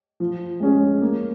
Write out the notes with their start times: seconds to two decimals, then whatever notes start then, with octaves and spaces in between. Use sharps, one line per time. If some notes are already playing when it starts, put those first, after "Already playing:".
0.20 F3
0.60 G#3 C#4 G#4
1.01 A#3